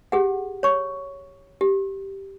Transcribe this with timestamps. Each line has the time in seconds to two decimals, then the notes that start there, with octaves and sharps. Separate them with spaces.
0.12 G4 G#4 F#5
0.63 C#5 C#6
1.61 G4